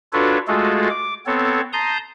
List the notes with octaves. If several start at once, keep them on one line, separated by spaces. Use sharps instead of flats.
D4 F4 F#4 A4 B4 C#5
G#3 A3 F4 F#4 G#4 A4
D6
B3 C4 A4 C#5
A5 A#5 C6 D#6 G6